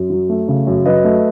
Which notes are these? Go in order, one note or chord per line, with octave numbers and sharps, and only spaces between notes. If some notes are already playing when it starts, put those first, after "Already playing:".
Already playing: F#2
F#3
A3
C#3
F#2
F#3 B4 D#5
A3